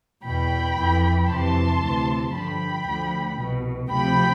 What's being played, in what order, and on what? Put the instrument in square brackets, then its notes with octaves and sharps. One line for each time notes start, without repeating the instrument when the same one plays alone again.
[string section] E2 B2 G5 B5
F2 E3
F2 C3 E3 A5 C6
D2 C3 E3
G2 D3 F3 G5 B5
D2 D3 F3
C2 B2
D2 C3 F3 G5 B5